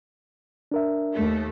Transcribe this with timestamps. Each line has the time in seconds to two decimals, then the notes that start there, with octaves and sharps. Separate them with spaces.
0.72 D4 A#4 E5
1.14 D#2 A3